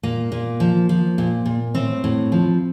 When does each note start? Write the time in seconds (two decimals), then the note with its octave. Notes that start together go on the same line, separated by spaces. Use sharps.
0.03 A#2 A#3
0.32 A#2
0.60 F3
0.89 F3
1.18 A#2
1.46 A#2
1.75 A2 C4
2.04 A2
2.32 F3